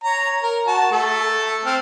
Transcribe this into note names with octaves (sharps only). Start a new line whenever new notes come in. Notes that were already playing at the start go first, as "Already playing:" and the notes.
C#5 A#5
A#4
F#4 A5
A3 A4
C4 F6